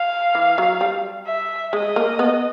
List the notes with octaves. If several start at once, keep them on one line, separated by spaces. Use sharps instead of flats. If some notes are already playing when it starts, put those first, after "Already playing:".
Already playing: F5
E3
F#3
G3
E5
G#3 D#5
A#3
B3